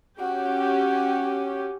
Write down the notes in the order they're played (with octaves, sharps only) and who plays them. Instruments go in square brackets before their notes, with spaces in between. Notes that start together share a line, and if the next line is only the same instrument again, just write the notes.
[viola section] C#4 G4 [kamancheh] F#4